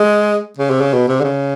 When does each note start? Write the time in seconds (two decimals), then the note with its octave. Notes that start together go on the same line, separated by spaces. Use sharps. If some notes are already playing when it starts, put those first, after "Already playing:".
Already playing: G#3
0.58 C#3
0.70 C3
0.81 C#3
0.93 B2
1.08 C3
1.20 D3
1.24 C#3